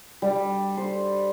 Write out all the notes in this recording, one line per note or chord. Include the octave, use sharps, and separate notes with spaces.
G3
C5